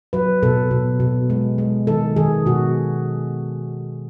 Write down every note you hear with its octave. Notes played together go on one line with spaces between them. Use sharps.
F#3 B4
B2 A4
B2
B2
G#3
G#3
D#3 A4
D#3 G#4
B2 F#4